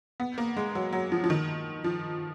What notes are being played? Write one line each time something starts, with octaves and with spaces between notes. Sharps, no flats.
B3
A#3
G#3
F#3
F#3
F3
F3
D#3
F3